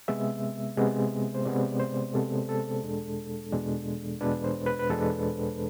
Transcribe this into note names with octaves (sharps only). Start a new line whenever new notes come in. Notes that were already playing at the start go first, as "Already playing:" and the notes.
C3 G#3 B3 E5
C3 G#3 B3
C5
C3 G#3 B3 D5
C5
C3 G#3 B3 A4
A4
E2 B2 G#3 D4
E2 B2 G#3 D4
E2 B2 G#3 D4 B4
C5
B4
B4
E2 B2 G#3 D4 A4